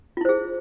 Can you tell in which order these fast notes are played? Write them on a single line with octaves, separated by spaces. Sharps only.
F4 E4 C5 G#4